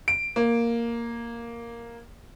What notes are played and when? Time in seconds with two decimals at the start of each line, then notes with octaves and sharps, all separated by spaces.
0.08 D7
0.36 A#3